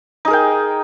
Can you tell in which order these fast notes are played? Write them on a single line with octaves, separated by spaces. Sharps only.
D#4 G#4 A#4 G5